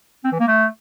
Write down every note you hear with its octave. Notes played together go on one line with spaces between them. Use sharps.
C4
E3
A#3
A3